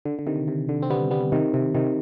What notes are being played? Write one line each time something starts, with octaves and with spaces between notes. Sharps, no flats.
D3
D3
C3 D#3
C3
D3
C4
G3 B3
G3 B3
C3 D#3
C3
C3 D#3